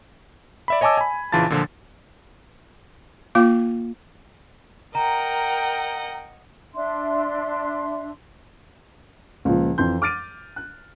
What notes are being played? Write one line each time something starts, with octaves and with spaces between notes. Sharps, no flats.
D5 E5 B5
C#5 D#5 G#5 A5 D6 E6
G#5 B5
A#1 C#3 E3 F4 A5 A6
A#2 D3 F3
A#3 F4 F5 D6
A#4 D#5 F#5 G5 A#5
D4 E5 C6
C#2 A#2 F3
F2 E3 C6 G6
D6 F6 A6 D7 D#7
F#6